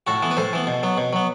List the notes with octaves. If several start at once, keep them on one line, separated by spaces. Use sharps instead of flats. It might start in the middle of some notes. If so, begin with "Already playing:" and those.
A2 F#4 A4
E3 B3
B4
A2 A4 C5
E3 B3
B2
F#3 B3
B2
F#3 B3